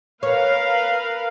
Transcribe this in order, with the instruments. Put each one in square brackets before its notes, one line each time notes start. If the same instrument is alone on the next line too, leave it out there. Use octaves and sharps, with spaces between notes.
[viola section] A#4 B4 F5 [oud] C#5